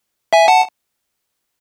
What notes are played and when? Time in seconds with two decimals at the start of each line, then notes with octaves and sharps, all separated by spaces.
0.33 E5 G#5
0.48 F#5 A5